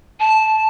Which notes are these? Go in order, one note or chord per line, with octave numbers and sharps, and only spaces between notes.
A5